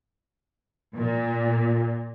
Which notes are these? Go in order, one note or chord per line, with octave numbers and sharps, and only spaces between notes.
A#2